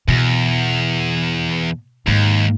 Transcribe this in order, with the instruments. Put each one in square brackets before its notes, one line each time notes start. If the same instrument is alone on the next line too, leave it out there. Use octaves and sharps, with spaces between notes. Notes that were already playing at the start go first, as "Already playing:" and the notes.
[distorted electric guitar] E2 [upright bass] B2
[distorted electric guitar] D#2 [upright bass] G#2 G#3